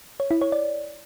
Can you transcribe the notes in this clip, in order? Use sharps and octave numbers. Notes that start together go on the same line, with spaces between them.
C#5
E4
C#5
D5